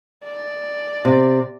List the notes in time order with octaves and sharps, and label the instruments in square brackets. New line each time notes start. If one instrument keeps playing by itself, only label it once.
[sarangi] D5
[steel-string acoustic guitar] C3